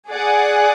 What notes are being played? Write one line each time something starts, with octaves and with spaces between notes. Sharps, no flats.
G#4 D5 F#5